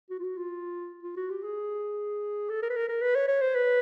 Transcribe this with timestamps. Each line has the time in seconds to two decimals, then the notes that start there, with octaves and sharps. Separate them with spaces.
0.10 F#4
0.19 F4
0.24 F#4
0.38 F4
1.03 F4
1.17 F#4
1.30 G4
1.43 G#4
2.49 A4
2.63 A#4
2.70 B4
2.76 A#4
2.89 A#4
3.02 B4
3.15 C#5
3.28 C#5
3.41 C5
3.55 B4